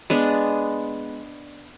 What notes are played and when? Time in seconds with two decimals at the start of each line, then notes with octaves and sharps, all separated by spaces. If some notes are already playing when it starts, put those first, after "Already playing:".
0.10 G#3 B3 D4